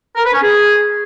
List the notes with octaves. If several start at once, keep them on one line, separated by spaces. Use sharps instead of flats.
A#4
B4
C#4
G#4